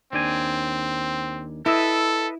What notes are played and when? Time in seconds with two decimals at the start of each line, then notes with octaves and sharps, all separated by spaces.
0.13 D#2 C4 D4 G#5
1.66 E4 A4 B4 D#5 E5